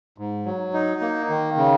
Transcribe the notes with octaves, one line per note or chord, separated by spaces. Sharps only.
G#2
F#3
D#4
A#3
D#3
C#3